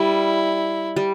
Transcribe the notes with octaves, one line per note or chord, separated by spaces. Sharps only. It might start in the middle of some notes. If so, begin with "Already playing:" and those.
Already playing: G3 E4
G3